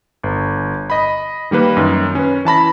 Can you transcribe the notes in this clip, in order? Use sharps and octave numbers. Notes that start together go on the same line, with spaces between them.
G1
D#5 B5
D#3 G3 A#3 B4
F#2 D#3
C#4 B4
E3 A5 B5 A#6